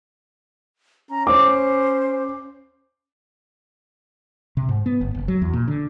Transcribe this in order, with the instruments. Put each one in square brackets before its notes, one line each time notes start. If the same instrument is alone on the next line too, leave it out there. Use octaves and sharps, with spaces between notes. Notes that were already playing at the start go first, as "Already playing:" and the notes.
[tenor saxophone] C#4 [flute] A#5
[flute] C5 [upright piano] D6
[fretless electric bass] C3
G#2
B3
G1
F#1
F#3
E2
A#2
D3